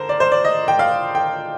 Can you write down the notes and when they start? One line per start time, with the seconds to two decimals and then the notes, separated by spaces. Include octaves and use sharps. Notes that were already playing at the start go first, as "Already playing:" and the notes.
Already playing: D3 A#4 C5
0.09 D5
0.20 C5
0.32 D5
0.45 D#5
0.68 G5
0.79 F5
1.15 G5